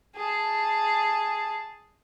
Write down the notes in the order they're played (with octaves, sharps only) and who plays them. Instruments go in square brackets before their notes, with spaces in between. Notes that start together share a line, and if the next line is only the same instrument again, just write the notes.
[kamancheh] G#4 A5